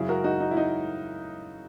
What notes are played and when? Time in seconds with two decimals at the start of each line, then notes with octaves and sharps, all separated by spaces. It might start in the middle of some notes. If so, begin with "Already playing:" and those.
Already playing: F#2 C#3 F#3 E4 G#4
0.08 F#4 A#4
0.24 D#4 F#4
0.40 D#4
0.51 E4
0.57 D#4